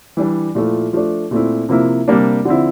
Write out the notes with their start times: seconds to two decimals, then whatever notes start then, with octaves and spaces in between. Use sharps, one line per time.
0.17 E3 G3 D4
0.55 A#2 F3 A3 E4
0.93 F3 A3 D4
1.31 A#2 A3 C4 E4
1.69 C3 F3 A#3 E4
2.08 C3 G3 A#3 D4
2.45 D3 F3 C4 E4